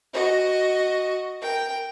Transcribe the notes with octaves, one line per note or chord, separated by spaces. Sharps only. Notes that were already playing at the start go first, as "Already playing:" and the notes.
F#4 D#5
A#4 G5